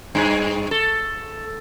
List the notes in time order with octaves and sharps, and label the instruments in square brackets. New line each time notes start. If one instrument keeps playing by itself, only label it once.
[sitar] G2 G#4
A4